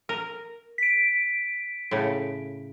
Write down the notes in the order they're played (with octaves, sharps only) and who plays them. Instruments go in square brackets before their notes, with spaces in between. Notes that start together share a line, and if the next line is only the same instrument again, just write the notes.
[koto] A#4
[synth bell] B6 D7
[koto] A2 C#3